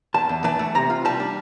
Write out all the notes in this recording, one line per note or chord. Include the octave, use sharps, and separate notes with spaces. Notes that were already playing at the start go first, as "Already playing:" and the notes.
E2 A5
E2
E3 A5
A3
C3 A#5
F4
G3 A5
D4